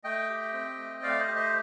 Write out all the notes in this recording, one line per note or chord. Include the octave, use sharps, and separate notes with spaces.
A3 D#5 G5
G4
C4
A3
A3 D5 F5
C5 D#5
G4
C5 D#5